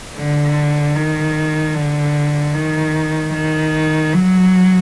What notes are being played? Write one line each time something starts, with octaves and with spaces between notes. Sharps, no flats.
D3
D#3
D3
D#3
D#3
F#3